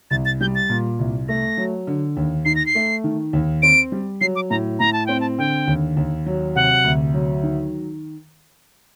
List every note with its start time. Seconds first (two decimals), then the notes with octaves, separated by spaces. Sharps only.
0.11 C2 A6
0.25 A6
0.41 G3 G6
0.55 A6
0.69 A#2
0.99 C2
1.29 A3 A#6
1.57 F#3
1.87 D3
2.17 D#2
2.45 D#4 C7
2.56 A#6
2.66 C7
2.75 A3
3.04 D#3
3.33 D#2
3.63 C4 D7
3.92 G3
4.21 F#3 C7
4.36 D6
4.50 A2 A#5
4.79 A2 A#5
4.93 A5
5.06 C4 G5
5.21 A5
5.38 D3 G5
5.67 D#2
5.97 D#2
6.26 F#3
6.55 C3 F#5
6.84 D2
7.14 F#3
7.43 D#3